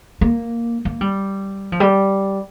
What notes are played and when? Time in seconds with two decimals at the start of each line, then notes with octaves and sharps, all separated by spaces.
0.21 A#3
0.85 A#3
1.01 G3
1.72 F3
1.80 G3